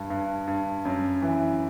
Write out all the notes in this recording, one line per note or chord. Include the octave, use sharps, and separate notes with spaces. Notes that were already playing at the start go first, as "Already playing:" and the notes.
Already playing: G2
G2
G2
F#2
E3